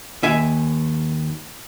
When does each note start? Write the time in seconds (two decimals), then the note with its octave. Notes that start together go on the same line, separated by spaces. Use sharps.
0.23 D#2 E5 G#5